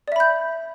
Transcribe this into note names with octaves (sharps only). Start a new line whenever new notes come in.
D5 E5 B5 G6